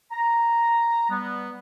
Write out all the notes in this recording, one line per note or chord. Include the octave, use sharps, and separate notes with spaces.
A#5
G3 B3